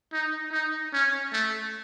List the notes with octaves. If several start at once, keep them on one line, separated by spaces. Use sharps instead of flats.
D#4
D#4
C#4
A3